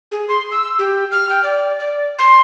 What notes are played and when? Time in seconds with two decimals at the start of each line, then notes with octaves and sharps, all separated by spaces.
0.12 G#4
0.29 C6
0.51 E6
0.79 G4
1.12 F6
1.29 G5
1.43 D5
1.79 D5
2.19 C6